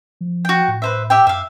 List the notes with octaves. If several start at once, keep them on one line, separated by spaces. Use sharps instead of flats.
F3
F#4 G5
A2
B4 C5 E5
G4 E5 G5
F#2 E5 F5